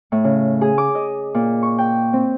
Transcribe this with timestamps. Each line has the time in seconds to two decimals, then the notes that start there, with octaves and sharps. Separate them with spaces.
0.12 A2
0.24 C#3
0.61 G#4
0.78 D6
0.95 D#5
1.34 A#2
1.63 C#6
1.78 G5
2.13 C4